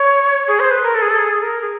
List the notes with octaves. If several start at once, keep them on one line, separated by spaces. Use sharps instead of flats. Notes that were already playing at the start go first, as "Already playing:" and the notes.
Already playing: C#5
G#4
C5
B4
A#4
A4
G#4
A4
G#4
A#4
G#4